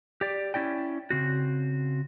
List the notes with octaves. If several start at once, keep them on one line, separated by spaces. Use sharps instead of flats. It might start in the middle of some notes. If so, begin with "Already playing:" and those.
G4 D5
C#4 E4 D5 G5
C#3 C4 F#4